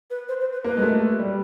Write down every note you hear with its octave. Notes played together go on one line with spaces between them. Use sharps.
B4
C5
C5
B4
A#3 B4
G#3
A3
G3